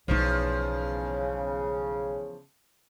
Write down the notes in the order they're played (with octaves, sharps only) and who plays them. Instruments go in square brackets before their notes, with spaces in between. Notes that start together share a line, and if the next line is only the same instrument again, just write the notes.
[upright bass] B1 D#4 [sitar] E2 F3 [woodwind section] C#3